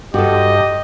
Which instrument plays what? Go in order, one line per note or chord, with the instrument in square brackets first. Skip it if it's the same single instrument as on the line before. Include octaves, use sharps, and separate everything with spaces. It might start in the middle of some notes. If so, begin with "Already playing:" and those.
[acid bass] G2 [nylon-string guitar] F#4 A4 [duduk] G4 [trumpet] D#5